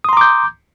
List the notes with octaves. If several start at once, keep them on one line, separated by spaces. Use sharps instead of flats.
A#5 C6 D6 D#6 G6